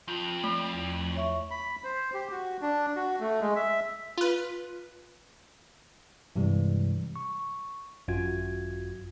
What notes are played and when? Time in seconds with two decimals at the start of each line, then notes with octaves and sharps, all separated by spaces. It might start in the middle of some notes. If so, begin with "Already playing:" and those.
0.08 F2 F4 G6
0.44 A3
0.73 E2
1.16 C#5 E5 C#6
1.51 B5
1.84 C5
2.14 G4
2.32 F#4
2.61 D4
2.96 F#4
3.20 A3
3.41 G#3
3.56 E5
4.18 F4 B4
6.36 G2 C3 E3 G3 G#3
7.16 C#6
8.08 G#1 F#2 F4 F#4 G#6